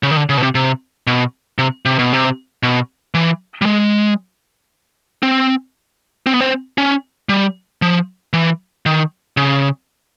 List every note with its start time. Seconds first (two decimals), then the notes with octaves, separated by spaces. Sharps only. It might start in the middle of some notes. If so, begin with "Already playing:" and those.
0.03 C#3
0.11 D#3
0.17 D3
0.29 C#3
0.37 B2
0.43 C3
0.55 C3
1.07 B2
1.58 C3
1.85 C3
1.99 B2
2.13 C3
2.63 B2
3.14 E3
3.62 G3
3.66 G#3
5.23 C4
6.26 C4
6.34 B3
6.41 C4
6.78 C#4
7.29 G3
7.82 F3
8.33 E3
8.86 D#3
9.37 C#3